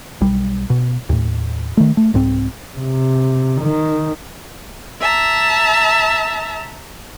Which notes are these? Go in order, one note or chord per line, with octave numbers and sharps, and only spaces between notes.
B1 G3
B2
D#2 A2
D#3 A3
A3
C2 G#2 C4
C3
D#3
E5 A5 A#5